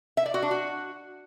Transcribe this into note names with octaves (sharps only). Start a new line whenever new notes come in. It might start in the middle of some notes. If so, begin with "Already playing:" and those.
E5
D5
F#4
D4
F#4